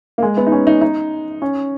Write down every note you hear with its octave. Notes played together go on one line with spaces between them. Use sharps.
A#3
G#3
B3
D#4
C#4
D#4
D#4
C#4